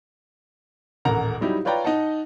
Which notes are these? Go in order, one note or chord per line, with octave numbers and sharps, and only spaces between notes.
D#1 A1 A#4 F#5 A#5
F#3 G3 D#4 E4 G4
F4 B4 C#5 D5 G5 A#5
D#4 D#5 F#5 A5